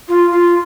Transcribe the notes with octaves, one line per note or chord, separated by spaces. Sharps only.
F4
F4